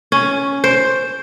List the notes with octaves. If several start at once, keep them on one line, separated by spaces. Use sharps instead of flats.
C#4
C5